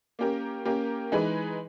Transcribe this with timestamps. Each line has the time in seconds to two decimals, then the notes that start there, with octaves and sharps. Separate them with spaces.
0.19 A#3 C#4 G4 A#4
0.65 A#3 C#4 G4 A#4
1.12 E3 G#3 D#4 G#4 B4